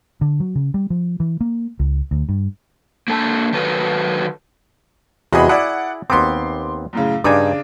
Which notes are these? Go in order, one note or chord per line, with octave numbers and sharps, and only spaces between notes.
D3
F#3
C#3
G3
F3
E3
A#3
C#2
D2
G2
A#3 D4 A4 G#5 A5
D#3 F#3 A4 B4
E2 C3 F#4 G#4 D#5 B5
E4 G#4 D5 F#5
D#2 B3 C4 C6 D6
F#2 A2 C#3
G2 C#3 D4 D#4 G#5 D6